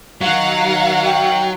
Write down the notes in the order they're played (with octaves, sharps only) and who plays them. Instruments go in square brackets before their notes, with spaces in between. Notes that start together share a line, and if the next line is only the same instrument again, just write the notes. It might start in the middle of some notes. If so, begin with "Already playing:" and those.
[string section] D#3 F5 F#5 [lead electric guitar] F#3
[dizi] G5